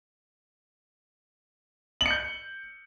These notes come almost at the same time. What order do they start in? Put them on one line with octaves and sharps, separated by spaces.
F#7 C#7 G6